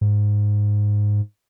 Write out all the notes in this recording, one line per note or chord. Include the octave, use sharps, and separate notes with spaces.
G#2